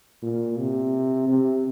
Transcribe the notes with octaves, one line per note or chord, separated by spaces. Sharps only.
A#2
C3
C3